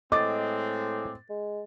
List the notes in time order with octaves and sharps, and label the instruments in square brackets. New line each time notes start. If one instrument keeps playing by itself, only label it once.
[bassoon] A2 [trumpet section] G#3 C4 [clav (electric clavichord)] D#5 [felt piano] D6 A6
[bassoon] G#3